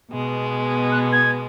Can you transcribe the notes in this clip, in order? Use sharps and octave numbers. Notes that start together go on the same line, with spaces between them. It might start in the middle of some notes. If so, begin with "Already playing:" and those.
B2 G#3 B3
F#6
G#6